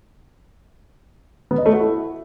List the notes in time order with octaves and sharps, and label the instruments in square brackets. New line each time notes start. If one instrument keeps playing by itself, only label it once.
[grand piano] B3
D#5
A3
F#4
E4